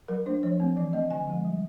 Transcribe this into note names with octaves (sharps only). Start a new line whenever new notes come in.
F#3 A#4
A3 D4 C5
F3 C#5
A3 C4
E3 D5
A3 C4 D#5
D3 G#5
F3 G#3
G3